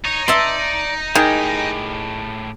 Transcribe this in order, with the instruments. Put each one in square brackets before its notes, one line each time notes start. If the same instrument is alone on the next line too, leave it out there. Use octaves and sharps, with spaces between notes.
[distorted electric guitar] D#4 [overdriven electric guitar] C#5
[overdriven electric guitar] D5 [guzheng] E5 A5 C6
[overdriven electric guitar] A2 G4 [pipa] D#3 [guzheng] G#4